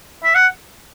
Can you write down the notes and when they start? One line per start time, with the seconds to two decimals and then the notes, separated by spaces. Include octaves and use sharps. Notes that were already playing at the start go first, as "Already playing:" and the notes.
0.24 E5
0.35 F#5